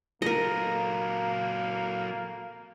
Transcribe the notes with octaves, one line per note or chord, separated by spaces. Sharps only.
F#3 A#3 A4 A#4 D#5